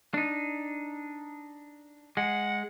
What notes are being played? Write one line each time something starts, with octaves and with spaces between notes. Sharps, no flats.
D4 D#4
G#3 F#5